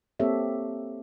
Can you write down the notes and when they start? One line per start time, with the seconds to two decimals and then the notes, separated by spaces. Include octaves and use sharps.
0.20 A#3 C4 G4 A4 C#5 E5